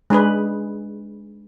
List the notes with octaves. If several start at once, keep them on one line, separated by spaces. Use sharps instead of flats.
G#3 D4 G#4 B4